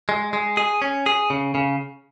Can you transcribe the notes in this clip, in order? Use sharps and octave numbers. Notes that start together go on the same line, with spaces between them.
G#3
G#3
G#4
C#4
G#4
C#3
C#3